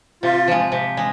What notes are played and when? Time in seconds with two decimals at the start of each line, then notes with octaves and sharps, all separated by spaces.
0.23 C3 F4
0.48 F3 G#3
0.72 C3
0.97 G#3